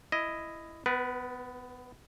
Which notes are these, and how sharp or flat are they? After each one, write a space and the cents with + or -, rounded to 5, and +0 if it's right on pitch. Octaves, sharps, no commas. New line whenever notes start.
E4 +10 D#5 +0
B3 +20 B4 -25